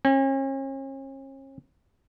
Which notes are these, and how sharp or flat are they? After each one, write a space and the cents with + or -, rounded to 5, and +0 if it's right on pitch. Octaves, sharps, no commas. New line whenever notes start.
C#4 -40